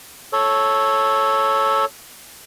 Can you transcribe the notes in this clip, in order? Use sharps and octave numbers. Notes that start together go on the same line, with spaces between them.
A4 C#5